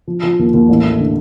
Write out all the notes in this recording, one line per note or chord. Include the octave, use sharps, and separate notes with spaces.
F3
F3
D#2
D#2
A1
A3
D3